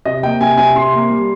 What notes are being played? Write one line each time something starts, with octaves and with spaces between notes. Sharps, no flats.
C3 D#5
A#3 G5
C3 G#5
C3 G#5
C3 C6
A#3
G3